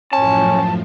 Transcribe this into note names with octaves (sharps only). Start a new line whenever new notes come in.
F#2 A2 F3 C#4 A5